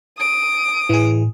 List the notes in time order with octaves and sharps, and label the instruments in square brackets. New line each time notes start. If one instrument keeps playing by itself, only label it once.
[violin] D#6 D7
[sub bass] A2 [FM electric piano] E3 G#4